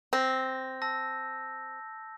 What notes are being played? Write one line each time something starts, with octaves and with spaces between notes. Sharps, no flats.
C4 G6 A#6
A5 E6 A#6